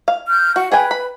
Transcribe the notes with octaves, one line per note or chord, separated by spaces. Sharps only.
F5
F6 G6
F#4 F#5
G#4 B4 G5 G#5
B5